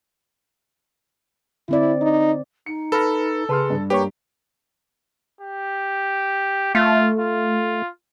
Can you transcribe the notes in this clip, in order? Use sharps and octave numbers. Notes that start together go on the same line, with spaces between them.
D3 C4 E4 D5
D#4
D#4 C#7
A4 B4 B5 F6 A#6
C#3 G#4 B4 A5 C6 F6
G2
A#3 G4 B4 C#5 C#6
G4
A3 F4
F4